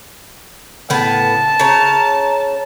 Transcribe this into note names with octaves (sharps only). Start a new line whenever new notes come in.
A2 C#3 B3 A5
C#3 C#5 A#5